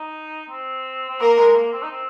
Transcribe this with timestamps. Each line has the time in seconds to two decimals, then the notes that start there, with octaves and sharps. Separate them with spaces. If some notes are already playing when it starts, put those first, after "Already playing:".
Already playing: D#4
0.50 C4
1.10 C4
1.21 A#3 A#4
1.38 G#3
1.55 A#3
1.73 C4
1.83 D#4
1.90 C4